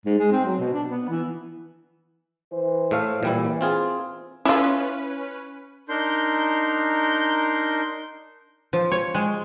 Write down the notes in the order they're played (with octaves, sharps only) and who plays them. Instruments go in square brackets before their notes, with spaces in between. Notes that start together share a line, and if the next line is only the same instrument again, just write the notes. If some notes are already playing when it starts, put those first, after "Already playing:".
[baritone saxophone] G#2
G#3
C4
F#3
B2
D4
B3
E3
[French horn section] E3 C5
[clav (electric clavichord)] A2 A3 F5
[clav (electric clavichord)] A#2 G3 E4 [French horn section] E3
[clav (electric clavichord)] C4 F4 G#4
[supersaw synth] C#4 B4 [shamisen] E4 F4
[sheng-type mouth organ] D4 D#4 A#4 C6 G6
[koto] F3
C#5
G#3